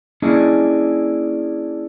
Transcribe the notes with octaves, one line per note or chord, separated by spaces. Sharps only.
A#3 C#4 D4 E4 G#4 D#5